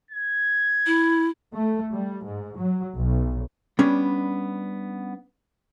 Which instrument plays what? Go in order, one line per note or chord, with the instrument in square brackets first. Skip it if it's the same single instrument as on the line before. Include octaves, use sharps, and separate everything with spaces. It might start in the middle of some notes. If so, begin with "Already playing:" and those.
[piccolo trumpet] G#6
[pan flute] E4
[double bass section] A3
G3
G#2
F#3
B1
[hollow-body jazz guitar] G3 B3 C#4 D4